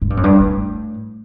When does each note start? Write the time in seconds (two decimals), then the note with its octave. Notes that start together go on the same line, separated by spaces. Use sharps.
0.02 G#2
0.10 G2
0.17 F#2
0.24 G2
0.40 A2